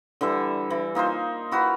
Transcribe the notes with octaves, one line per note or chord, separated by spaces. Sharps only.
D3 E3 G3 E5
E3
A#3 D#4 F4 C5
E4 F#4 A#4 B4